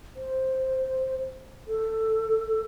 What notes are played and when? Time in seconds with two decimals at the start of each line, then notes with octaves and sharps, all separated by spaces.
0.16 C5
1.68 A4